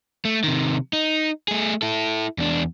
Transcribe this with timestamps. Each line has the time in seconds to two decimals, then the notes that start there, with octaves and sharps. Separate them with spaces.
0.25 A3
0.44 C3 D#3
0.93 D#4
1.48 A3 G#4
1.82 E4 A4
2.38 E2 D4